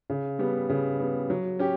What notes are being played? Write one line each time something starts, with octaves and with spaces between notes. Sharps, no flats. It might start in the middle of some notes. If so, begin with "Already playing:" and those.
C#3
G3 B3
C#3
G3 B3
F#3
C#4 G4